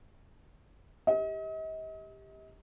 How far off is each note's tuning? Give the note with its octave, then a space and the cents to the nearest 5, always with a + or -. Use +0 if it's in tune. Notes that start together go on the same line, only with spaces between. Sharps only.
G4 +10 D#5 +40